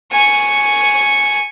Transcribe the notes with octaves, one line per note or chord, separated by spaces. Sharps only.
G#5 C#6